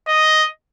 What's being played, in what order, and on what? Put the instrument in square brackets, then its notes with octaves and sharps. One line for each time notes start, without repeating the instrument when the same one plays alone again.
[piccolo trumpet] D#5